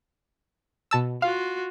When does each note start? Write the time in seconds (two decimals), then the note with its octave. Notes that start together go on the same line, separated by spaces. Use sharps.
0.91 B2 A5 E6
1.22 F4 F#4 F5